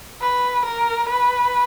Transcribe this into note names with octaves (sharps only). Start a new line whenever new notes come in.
B4
A#4
B4